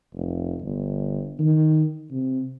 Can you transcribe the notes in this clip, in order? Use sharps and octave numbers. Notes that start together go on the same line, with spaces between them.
F1
G1
D#3
C3